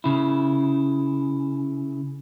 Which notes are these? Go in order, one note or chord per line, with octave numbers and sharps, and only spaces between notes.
C#3 E4